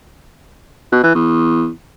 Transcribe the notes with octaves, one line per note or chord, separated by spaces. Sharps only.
B2
E3
E2